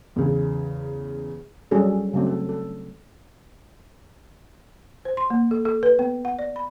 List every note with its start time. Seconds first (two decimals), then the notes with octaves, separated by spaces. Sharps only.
0.16 E2 C#3
1.71 F#3 G3 C#4 F#4 G#4 A4
2.13 C#3 F#3 A3 C4
2.26 A4
2.49 A4
5.05 C5
5.17 C6
5.30 A#3
5.51 A4
5.65 A4
5.83 B4
5.99 B3
6.25 F#5
6.39 D5
6.56 B5